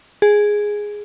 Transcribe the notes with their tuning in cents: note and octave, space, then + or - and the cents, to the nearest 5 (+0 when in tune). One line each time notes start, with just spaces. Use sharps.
G#4 +0